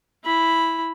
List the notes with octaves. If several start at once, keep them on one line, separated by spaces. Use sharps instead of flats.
E4 B5